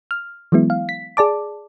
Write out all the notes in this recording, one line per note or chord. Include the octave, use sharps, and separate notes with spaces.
F6
E3 F#3 G#3 B3 E4
F5
B6
G#4 D5 A5 D6